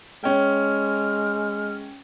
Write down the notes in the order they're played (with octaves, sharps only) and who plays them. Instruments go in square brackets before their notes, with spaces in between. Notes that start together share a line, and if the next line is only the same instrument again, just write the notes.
[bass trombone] G#3 [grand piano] C#4 G5 [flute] F6